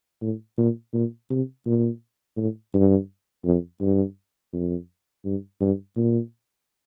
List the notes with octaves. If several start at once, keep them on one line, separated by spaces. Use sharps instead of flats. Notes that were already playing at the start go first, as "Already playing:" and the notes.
A2
A#2
A#2
C3
A#2
A2
G2
F2
G2
F2
G2
G2
A#2